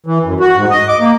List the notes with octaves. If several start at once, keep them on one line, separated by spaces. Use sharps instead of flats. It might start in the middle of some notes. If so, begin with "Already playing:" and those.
E3
F#2
F#4
G#2
D#5
D6
A#3